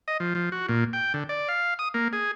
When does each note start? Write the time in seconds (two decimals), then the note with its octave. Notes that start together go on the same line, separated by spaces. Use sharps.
0.08 D#5
0.20 F3
0.35 F3
0.52 F#4
0.69 A#2
0.93 G5
1.14 D3
1.29 D5
1.48 F5
1.79 D#6
1.94 A#3
2.13 G#4